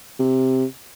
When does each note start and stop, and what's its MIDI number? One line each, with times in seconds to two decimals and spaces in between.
0.19 0.65 48